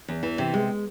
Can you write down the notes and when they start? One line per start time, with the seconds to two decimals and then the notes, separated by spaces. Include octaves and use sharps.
0.08 E2
0.23 E3
0.38 C3
0.54 G#3